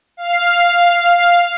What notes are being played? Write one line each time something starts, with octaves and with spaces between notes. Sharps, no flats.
F5